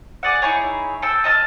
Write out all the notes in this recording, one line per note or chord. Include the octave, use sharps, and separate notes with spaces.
G#4 D5 F#5
D#4 E4 G#4 C#5
A4 G5 E6
F4 D#5 A5